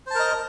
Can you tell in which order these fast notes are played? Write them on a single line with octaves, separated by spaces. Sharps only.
C5 A5 A#4 D#5